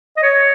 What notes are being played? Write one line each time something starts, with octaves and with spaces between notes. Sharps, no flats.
D#5
C#5